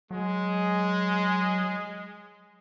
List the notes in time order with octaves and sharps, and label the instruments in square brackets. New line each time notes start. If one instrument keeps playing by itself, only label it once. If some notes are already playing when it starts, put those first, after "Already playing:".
[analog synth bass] F#3 [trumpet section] G#3